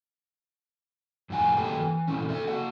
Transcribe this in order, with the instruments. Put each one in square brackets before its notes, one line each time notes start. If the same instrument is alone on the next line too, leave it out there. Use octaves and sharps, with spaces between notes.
[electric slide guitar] F2 A2 F#5 G#5
F#2 A#3 G4 A4 G5 A5
E3
A#2 D3 E3 A3 C#4
A4 D5 E5
A#3 F#4 F#5